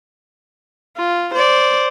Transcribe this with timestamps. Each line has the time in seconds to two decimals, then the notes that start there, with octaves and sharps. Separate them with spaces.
0.97 F4
1.35 C5 D5